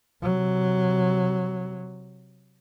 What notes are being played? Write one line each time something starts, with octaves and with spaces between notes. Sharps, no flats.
C3 F#3